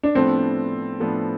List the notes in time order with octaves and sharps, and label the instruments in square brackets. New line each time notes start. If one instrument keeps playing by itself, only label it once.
[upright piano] D4
[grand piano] A2 F3 B3 D4 A4 [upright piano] C4
[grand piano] A2 F3 B3 D4 A4